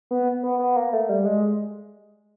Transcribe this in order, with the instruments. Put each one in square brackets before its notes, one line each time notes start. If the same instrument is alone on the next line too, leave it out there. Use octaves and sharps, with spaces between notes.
[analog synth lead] B3
B3
B3
A#3
A3
G3
G#3